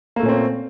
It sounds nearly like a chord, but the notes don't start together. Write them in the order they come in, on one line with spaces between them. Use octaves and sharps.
A#3 A3 A#2 C#4 C4